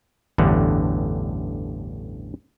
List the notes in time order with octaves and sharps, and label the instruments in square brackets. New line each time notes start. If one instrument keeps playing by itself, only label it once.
[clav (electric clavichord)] A1 E2 G2 D3